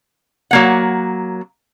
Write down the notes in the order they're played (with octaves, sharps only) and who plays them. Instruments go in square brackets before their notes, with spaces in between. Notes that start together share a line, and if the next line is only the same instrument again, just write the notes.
[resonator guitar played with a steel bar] F#3 A#3 F#5